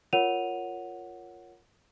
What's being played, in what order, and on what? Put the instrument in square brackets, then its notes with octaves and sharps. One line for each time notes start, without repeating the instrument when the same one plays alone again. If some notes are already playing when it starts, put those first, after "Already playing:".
[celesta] F4 A#4 C#5 F#5 D#7 F7